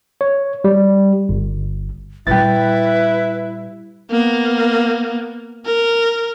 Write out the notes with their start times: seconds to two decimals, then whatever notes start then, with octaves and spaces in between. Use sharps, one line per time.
0.21 C#5
0.64 G3
1.29 G1
2.27 A#2 G3 E4 G4 B4 A6
4.11 A#3 B3
5.66 A#4